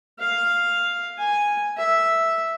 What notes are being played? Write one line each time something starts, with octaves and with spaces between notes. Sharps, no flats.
F5
G#5
E5